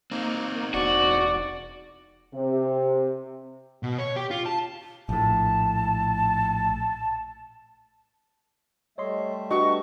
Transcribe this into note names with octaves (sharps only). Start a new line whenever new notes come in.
A#3 C4 D#4
E1 F#4 D5
C3
B2
C#5
G4
F4
A5
A#1 A2 A5
G3 A3 C#5 D#5 E5 C6
D4 F#4 G4 B4 D#5 C#6